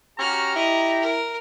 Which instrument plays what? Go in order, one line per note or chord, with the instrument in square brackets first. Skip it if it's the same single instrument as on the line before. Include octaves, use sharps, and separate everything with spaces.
[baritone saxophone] C#4 [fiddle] F#4 F6 [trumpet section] G4 A#5
[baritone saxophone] E4 [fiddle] D#5
[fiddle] A#4